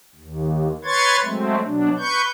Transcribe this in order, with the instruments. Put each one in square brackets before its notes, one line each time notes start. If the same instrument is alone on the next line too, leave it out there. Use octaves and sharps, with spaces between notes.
[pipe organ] D#2
B4 C#5 C6 C#6 G#6 A6
F#3 G#3 A3 C4
B2 F#3 D4
B4 C#6 G6